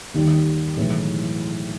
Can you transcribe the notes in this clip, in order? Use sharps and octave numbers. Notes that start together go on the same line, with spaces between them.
D#2 D#3 G3
B1 A2 E3 G#3